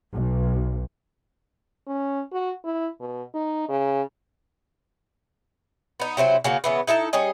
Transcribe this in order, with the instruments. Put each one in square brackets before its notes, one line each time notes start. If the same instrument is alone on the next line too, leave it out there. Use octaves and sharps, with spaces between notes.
[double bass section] B1
[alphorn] C#4
F#4
E4
B2
D#4
C#3
[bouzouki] B3 D#4
C3 F#3 E4 C5
C#3 A#3 F#4
C#3 E3 B3
D#4 E4 A4 A5
G3 C#4 G#4 D#5